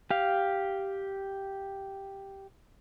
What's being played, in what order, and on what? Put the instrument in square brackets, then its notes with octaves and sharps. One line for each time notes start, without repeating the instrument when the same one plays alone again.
[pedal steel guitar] G4 F5